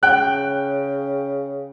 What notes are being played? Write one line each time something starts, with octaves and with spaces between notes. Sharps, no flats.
C#3 G5 F#6